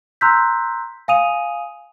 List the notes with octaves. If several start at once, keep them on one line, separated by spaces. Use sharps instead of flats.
A#5 C6 E6 F#6 G6 B6
F5 G#5 D#6 D#7 F7